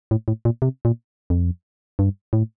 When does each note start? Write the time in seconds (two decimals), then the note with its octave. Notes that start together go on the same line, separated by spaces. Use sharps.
0.11 A2
0.28 A2
0.45 A#2
0.62 C3
0.85 A#2
1.30 F2
1.99 G2
2.33 A2